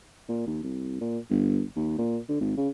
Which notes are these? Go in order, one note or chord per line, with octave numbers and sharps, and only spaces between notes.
A#2
D#2
C2
A#2
G1
D#2
A#2
D3
G#1
C#3